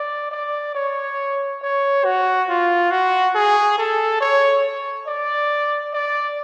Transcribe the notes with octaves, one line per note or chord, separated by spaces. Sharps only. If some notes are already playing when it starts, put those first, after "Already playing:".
Already playing: D5
D5
C#5
C#5
F#4
F4
F#4
G#4
A4
C#5
D5
D5